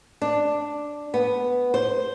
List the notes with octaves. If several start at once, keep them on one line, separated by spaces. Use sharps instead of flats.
D4
B3
C5